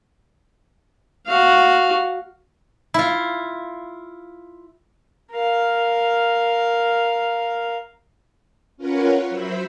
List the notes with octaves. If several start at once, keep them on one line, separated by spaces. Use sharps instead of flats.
F#4 F5
E4 F4
A#4 F5
C#4 F4 A#4 B4 C#5 F#5
F#3 C5 E5 B5